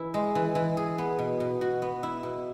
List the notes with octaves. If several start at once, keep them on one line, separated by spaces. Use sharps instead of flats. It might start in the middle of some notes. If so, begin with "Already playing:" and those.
Already playing: E3 E4
G#3
E3
E3
G#4
B3
B2
B2
F#4
B3
E4
B2